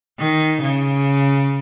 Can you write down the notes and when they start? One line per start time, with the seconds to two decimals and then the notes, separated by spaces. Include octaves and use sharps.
0.19 D#3
0.62 C#3